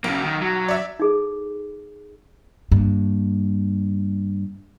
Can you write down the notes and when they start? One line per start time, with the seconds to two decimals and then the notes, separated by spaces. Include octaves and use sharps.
0.04 B1 C#3 A#3
0.23 D#3
0.41 F#3
0.68 D5 E5
0.99 D#4 G#4 A4
2.72 G2 A#3